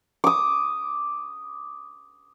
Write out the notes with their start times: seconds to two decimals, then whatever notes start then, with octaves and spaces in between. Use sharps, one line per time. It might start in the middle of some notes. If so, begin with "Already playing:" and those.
0.24 D6 D#6